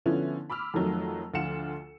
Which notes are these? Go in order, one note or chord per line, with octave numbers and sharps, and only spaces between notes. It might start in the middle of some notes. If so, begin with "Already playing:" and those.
D3 F3 B3 C#4 E4
B5 D6 E6 F6
F2 D#3 F#3 A3
D2 F3 F4 F#5 C#7 E7